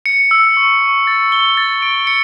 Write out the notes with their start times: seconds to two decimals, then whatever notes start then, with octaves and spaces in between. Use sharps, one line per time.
0.06 C#7
0.31 E6
0.57 C#6
0.81 C#6
1.07 A6
1.32 G7
1.57 A6
1.82 D7
2.07 C#7